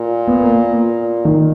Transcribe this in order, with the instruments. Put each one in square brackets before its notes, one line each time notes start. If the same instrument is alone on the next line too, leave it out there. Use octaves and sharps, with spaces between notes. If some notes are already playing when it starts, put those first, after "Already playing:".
Already playing: [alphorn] A#2
[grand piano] B3
A#3
[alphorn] A#2
[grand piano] D#3